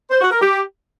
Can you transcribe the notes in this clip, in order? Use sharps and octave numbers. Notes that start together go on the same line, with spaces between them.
C5
F#4
A#4
G4